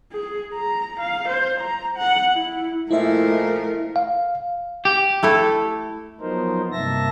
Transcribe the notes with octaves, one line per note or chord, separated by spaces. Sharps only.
G#4
A#5
F5
C5
A#5
F#5
E4
A#2 F3 A3 E4 A#4 D#5 E5
F5
G4
A3 E4 A4
F3 F#3 B3 D#4 A#4 C5
G2 C3 A#3 E5 A5 A#6